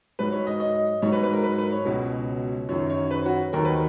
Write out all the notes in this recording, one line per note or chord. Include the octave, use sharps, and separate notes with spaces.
G#2 F#3 B4
C#5
D#5
D#5
G#2 F#3 C#5
B4
B4
A#4
B4
B4
C#5
C#2 B2 F#3
F#2 D#3 F#3 C#5
C#5
B4
F#4
D#2 D#3 F#3 A#4
B4